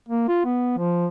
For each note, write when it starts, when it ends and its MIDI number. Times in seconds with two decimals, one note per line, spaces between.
0.09 0.28 58
0.28 0.44 65
0.45 0.75 59
0.78 1.06 53